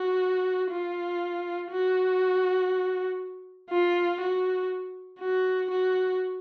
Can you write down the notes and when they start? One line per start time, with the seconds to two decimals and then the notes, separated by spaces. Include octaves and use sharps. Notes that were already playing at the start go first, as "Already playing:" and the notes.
Already playing: F#4
0.71 F4
1.72 F#4
3.70 F4
4.21 F#4
5.20 F#4
5.71 F#4